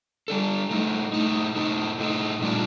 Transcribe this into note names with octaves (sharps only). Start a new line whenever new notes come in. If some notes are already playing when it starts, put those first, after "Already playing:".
G3 D4 A4
A2 A3 D#4
A2 A3 D#4
A2 A3 D#4
A2 A3 D#4
A#2 G3 D4 F4